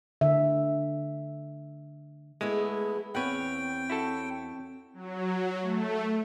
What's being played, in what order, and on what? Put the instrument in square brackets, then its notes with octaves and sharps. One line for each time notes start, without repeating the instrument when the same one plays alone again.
[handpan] D3 E5
[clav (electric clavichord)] G#3 [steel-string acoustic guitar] A3 B3 E4 [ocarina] G#4
[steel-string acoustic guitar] E2 C#5 [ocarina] C4 [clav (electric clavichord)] B4 F#5 [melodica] G5
[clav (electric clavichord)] E4 F#4 A4
[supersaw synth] F#3
A3